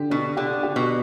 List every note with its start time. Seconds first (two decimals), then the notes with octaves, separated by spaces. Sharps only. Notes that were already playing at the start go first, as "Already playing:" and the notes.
Already playing: D3 G4
0.10 B2 D4
0.37 D3 G4
0.63 G4
0.76 B2